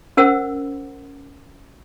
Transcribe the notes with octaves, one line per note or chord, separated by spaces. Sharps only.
C#4 A#4 C5 F#5 E6